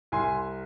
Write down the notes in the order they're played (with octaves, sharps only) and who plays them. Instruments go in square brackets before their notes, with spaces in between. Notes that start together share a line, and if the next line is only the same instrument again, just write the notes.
[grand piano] C2 G#5 C6